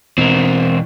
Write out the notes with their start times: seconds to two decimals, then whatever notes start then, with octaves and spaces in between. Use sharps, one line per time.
0.18 B2 E3 C4 A#4